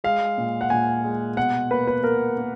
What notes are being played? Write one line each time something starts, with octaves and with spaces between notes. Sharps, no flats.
G#3 F5
A#2
F#5
A#2 G#5
G#3
B2 F#5
A#3 B4
B4
A#3 A#4
A#3